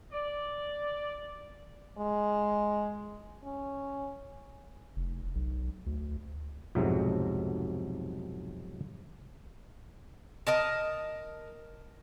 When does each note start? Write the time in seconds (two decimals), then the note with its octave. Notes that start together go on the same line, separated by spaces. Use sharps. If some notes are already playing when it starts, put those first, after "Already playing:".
0.12 D5
1.98 G#3
3.44 C#4
4.96 F1
5.35 B1
5.86 D2
6.75 B1 F2 G#2 C3 F#3
10.47 A#4 D#5 A5